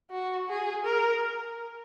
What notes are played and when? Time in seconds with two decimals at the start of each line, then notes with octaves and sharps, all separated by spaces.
0.11 F#4
0.49 G#4
0.85 A#4